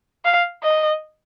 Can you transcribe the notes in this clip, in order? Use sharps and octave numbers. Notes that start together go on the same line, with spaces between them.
F5
D#5